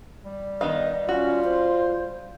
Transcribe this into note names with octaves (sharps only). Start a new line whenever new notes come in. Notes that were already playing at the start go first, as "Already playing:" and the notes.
G3
D#3 B3 D#5 F5
C#4 F4 F#4
C5